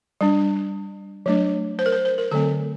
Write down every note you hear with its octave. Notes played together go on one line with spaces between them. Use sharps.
G3 D4
F#3 A3 D4
C5
A#4
C5
C5
A#4
D3 F#3 A3 C4 A4